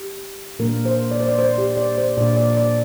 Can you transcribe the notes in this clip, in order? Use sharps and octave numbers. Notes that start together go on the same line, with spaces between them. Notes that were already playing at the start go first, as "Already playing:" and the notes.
Already playing: G4
A#2 A#3 D4 A#4
C5
D5
C5
D5
C5
G4
D5
C5
A#2 A#3 D4 D5
D5
D5